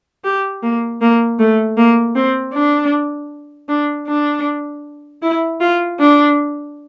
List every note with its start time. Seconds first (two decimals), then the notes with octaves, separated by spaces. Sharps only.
0.24 G4
0.63 A#3
1.01 A#3
1.39 A3
1.77 A#3
2.15 C4
2.53 D4
3.69 D4
4.08 D4
5.22 E4
5.60 F4
5.99 D4